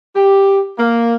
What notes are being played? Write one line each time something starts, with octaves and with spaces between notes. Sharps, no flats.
G4
A#3